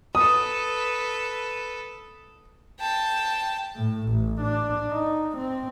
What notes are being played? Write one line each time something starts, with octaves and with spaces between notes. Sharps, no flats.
A4 B4 D#6
G5 A5
A2
A1
D4
D#4
C4